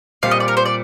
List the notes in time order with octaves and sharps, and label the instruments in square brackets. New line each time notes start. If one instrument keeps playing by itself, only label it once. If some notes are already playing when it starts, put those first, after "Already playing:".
[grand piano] A#2 G3 C4 F4 [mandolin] F5
[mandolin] D#5
D5
A#4
C5
D5